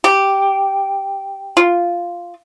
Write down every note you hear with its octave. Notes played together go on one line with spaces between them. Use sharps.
G4
F4